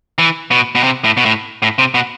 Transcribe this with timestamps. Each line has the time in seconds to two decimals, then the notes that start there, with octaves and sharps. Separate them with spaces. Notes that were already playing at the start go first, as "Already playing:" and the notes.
0.18 E3
0.51 B2
0.75 B2
0.83 C3
1.04 A2
1.17 B2
1.25 A2
1.62 A2
1.79 C3
1.94 B2